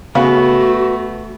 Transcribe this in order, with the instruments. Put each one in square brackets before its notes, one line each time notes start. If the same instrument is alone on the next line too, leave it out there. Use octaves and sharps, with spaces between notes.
[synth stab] C#3 [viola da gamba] A3 [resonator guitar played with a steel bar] B3 [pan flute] F#4